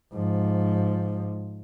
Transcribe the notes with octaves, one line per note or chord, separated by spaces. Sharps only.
G#2 F3